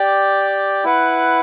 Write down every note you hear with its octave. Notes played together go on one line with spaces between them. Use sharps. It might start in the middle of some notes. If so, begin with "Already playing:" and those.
Already playing: G4 D5 G5
E4 B4 F#5